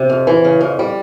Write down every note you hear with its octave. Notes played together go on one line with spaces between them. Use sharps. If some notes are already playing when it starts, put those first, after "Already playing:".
Already playing: C3
F2
E3
C#3
F2
G3